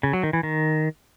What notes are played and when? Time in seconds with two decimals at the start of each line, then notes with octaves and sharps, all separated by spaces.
0.03 C#3
0.13 F#3
0.23 D#3
0.33 E3
0.43 D#3